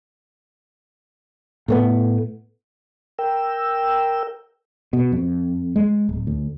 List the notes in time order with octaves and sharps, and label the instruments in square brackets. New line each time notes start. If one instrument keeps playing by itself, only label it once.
[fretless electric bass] A2 A3 B3
[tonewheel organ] A#4 G5 E6
[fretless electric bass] B2
F2
G#3
D1
D2